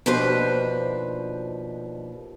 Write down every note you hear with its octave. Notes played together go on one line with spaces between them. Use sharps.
D#2 B2 F3 D4 B4 C5